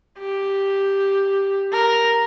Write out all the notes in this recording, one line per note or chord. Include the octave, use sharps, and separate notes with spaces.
G4
A#4